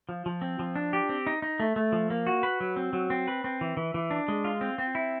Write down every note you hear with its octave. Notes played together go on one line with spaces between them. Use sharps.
F3
F3
C4
F3
D4
G4
C4
D#4
D#4
A3
A3
F3
A#3
F#4
B4
F#3
C4
F#3
C4
B4
C4
E3
E3
E3
D4
G#3
F4
C4
C4
E4